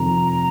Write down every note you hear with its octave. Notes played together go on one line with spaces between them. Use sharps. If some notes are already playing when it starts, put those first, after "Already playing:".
Already playing: F1 F2 D#3 A#5